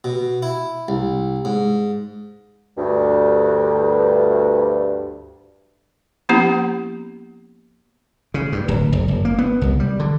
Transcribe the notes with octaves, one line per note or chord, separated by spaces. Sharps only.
B2
E4
C2
G#2
D2 G2
F3 A#3 B3 C#4 E4 G4
C#3
G2
D1
F#1
F#1
A#3
B3
C2
G3
D3